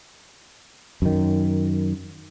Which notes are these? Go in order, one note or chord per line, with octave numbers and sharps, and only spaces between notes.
F#2 D#3